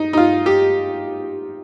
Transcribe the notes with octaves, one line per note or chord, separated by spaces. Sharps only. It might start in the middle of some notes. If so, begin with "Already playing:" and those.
Already playing: D#4
D#4
F4
G4